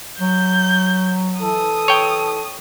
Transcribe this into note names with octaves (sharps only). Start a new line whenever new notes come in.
F#3 G6
E3 A4 D#6
C#5 G5